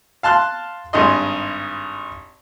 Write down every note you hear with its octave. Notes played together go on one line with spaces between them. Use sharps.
F5 A5 C6 F#6
G#1 G2 D#5 C6